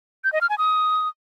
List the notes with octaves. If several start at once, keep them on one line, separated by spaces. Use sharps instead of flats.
G6
D#5
F6
G#5
D#6